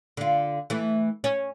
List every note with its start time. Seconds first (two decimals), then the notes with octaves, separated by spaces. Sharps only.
0.17 D3 F4
0.70 E3 A3
1.24 C#4